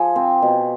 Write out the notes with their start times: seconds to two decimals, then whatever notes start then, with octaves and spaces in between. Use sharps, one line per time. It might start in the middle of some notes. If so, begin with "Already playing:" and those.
Already playing: F3 G#4
0.16 C4
0.42 B2